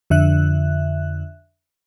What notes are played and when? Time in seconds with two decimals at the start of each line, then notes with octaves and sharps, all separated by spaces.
0.10 F2 D3 E5 F#6